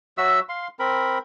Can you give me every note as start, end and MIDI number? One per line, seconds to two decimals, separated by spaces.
0.18 0.40 54
0.18 0.40 66
0.18 0.40 76
0.18 0.40 88
0.49 0.68 77
0.49 0.68 84
0.79 1.18 60
0.79 1.18 70
0.79 1.18 83